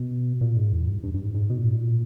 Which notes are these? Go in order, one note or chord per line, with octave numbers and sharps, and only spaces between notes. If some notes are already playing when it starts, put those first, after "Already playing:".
Already playing: B2
A#2
G#2
E2
G2
G2
G2
G#2
G#2
B2
A#2
G#2
A#2